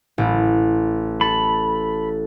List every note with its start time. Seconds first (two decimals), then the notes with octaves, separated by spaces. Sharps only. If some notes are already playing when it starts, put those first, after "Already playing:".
0.18 A1
1.21 A4 B5